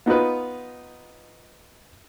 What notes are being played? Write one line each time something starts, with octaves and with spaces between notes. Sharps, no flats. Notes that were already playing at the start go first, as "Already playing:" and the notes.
B3 D#4 F4 B4